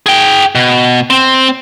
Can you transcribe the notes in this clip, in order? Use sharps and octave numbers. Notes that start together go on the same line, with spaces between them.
G#4 G5
B2
C4